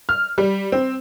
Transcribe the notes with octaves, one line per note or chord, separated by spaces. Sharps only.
F6
G3
C4